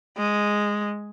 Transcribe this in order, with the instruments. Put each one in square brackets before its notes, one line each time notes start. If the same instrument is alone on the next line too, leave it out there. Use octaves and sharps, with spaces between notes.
[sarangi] G#3